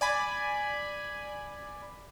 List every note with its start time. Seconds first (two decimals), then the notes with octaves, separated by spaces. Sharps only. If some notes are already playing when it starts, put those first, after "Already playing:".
0.01 D5 G#5 B5